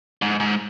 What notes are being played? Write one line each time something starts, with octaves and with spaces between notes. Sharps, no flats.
G#2
G#2